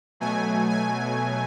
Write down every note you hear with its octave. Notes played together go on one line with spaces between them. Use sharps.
B2 F#3 A3 G#5
G#5